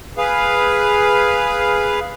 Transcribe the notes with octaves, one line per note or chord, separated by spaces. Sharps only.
G#4 B4 F5